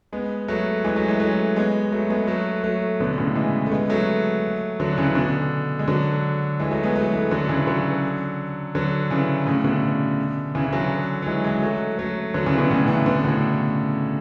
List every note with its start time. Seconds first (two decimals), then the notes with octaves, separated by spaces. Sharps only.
0.12 G#3 B3
0.48 F#3 A3
0.84 E3 G#3
0.96 F#3 A3
1.08 E3 G#3
1.20 F#3 A3
1.56 G#3 B3
1.92 F#3 A3
2.10 G#3 B3
2.27 F#3 A3
2.64 F#3 A3
3.00 B2 D3
3.18 A2 C#3
3.35 E3 G#3
3.66 A3
3.71 G#3 B3
3.89 F#3 A3
4.80 D3 F#3
4.98 C#3 E3
5.15 B2 D3
5.79 G#3
5.88 D3 F#3
6.60 E3 G#3
6.71 F#3 A3
6.83 G#3 B3
6.95 F#3 A3
7.13 E3 G#3
7.31 D3 F#3
7.49 C#3 E3
7.67 D3 F#3
8.75 D3 F#3
9.11 C#3 E3
9.47 A2 C#3
9.64 B2 D3
10.55 C#3 E3
10.65 E3
10.73 D3 F#3
11.22 F#3
11.27 E3 G#3
11.44 E3 G#3
11.62 F#3 A3
11.99 F#3 A3
12.34 D3 F#3
12.46 C#3 E3
12.58 B2 D3
12.70 A2 C#3
12.88 C#3 E3
13.06 B2 D3
13.24 A2 C#3